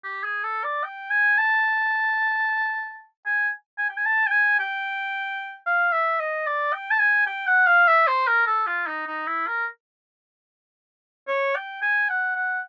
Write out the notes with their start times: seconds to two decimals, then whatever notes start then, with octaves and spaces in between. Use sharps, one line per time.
0.04 G4
0.24 G#4
0.44 A4
0.64 D5
0.84 G5
1.11 G#5
1.38 A5
3.26 G#5
3.78 G#5
3.90 G5
3.97 G#5
4.06 A5
4.27 G5
4.32 G#5
4.59 G5
5.66 F5
5.92 E5
6.20 D#5
6.47 D5
6.73 G5
6.91 A5
6.99 G#5
7.27 G5
7.47 F#5
7.67 F5
7.88 E5
8.07 C5
8.27 A#4
8.47 A4
8.67 F4
8.87 D#4
9.07 D#4
9.28 E4
9.48 A#4
11.28 C#5
11.56 G5
11.82 G#5
12.09 F#5
12.36 F#5